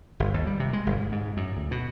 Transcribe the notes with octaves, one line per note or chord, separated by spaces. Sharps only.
G1
D#2
G3
C3
G#3
G1
G#2
G#2
F#2
D2
B2